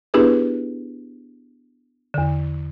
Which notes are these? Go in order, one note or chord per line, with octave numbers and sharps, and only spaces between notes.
B3 D4 E4 G4 G#4 B4
E2 D3